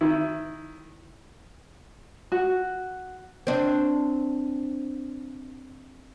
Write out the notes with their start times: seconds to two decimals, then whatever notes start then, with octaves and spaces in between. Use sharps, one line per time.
0.01 D#3 E4
2.32 F#4
3.47 C4 D4